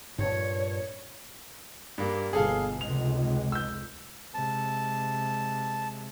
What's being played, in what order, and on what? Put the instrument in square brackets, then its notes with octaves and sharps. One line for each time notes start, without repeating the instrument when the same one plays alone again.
[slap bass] G2 A#2 [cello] C#5
[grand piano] G2 A#3
[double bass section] G1 B2 [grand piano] G#4 A4 F5
[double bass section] F1 C#2 G#3 [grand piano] F7
[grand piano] E6 G6
[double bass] C3 G#3 [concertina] A5